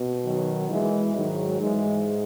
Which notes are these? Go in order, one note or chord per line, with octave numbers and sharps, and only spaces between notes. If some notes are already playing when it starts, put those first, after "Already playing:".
Already playing: B2
D#3 F#3
E3 G#3
G#2 D#3 F#3
G#2 E3 G#3